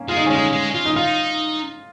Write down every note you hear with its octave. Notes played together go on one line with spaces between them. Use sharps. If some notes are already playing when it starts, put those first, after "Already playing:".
Already playing: A#3 C#4
G#3 F4
D#4
C#4
G#3 D#4
G#3
F4
D#4
D#4 F4